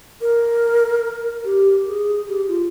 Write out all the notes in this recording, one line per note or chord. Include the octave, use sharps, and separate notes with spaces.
A#4
G4
G#4
G4
F4